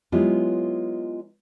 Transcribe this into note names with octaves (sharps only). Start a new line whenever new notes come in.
F#3 G#3 B3 E4 F4 G4